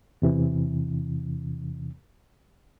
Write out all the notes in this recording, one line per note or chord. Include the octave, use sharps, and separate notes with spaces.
E2 C3 E3